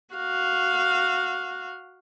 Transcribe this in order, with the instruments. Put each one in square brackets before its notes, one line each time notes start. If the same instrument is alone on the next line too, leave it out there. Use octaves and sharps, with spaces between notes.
[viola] F#4 F5